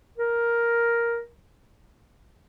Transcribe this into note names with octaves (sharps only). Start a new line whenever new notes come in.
A#4